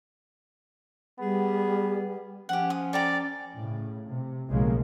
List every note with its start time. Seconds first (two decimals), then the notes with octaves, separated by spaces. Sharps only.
1.20 G3 B3 G#4
2.49 F3 C#4 G4 F#5
2.70 D#6
2.93 A4 D5 G5 A#5
3.56 A2 C#3
4.07 C3
4.49 B1 A2 C#3 F3 G#3 A#3